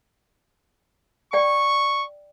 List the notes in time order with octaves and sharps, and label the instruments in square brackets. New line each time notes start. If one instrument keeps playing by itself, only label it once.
[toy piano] D5 G5 [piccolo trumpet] C#6